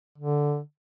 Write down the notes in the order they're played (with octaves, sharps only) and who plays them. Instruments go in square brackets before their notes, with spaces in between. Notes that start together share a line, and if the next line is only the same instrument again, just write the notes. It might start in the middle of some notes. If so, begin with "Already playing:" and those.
[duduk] D3